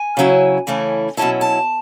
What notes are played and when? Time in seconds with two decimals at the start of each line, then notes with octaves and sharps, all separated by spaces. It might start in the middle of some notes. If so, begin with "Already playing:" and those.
Already playing: G#5
0.17 C#3 F#3 C#4 E4
0.67 C#3 E3 A3 C#4 E4
1.17 B2 F#3 C#4 E4 A5
1.41 A5